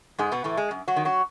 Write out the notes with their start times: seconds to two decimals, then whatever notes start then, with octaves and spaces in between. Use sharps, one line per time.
0.19 G#2 G#3 G#4
0.32 B2 B3
0.44 A2 E3 A3
0.57 G#3
0.71 F#2
0.88 F#3 F#4
0.96 D#3
1.05 F#3 F#4